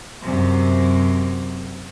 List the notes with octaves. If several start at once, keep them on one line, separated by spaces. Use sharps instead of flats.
F#2 C3